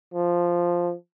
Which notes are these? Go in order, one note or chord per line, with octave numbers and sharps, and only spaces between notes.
F3